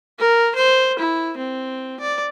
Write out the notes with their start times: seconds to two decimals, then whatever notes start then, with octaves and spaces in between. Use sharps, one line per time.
0.19 A#4
0.55 C5
0.99 E4
1.37 C4
2.00 D5